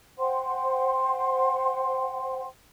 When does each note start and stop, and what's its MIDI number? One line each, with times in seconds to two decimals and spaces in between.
0.18 2.45 72
0.18 2.45 78
0.18 2.45 79
0.18 2.45 84